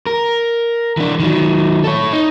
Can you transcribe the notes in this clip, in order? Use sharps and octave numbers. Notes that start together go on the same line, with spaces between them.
A#4
E3 D4
D#3 F#3
A4 C#5
D#4